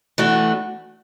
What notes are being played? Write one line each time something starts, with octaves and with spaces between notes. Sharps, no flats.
E3 A3 D4 F#4